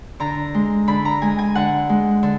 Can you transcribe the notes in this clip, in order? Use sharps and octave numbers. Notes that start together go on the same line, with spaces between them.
D3 A#5
G#3
D3 B5
A#5
G#3 G#5
G#5
D3 F#5
G#3
D3